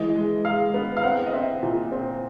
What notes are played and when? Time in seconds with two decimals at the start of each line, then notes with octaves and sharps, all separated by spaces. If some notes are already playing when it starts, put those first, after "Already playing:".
Already playing: E3 G#3 D#5
0.15 G#3
0.45 G#3 F5
0.74 B3
0.97 F5
1.03 C4 F#5
1.26 D#5
1.33 C4 E5
1.62 A#2
1.92 C4